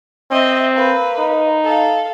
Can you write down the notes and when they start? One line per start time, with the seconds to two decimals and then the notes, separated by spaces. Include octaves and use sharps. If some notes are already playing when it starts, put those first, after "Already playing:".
0.31 C4 D#5 E5
0.75 A#3 B4
1.18 D#4
1.64 A4 F5